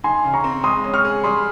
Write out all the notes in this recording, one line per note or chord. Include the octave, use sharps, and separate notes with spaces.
D#4 G#5 C6
C#3
A#5 C#6
C4
G#3 C6 D#6
C#4
C#6 F6
G#4
G3 C6 D#6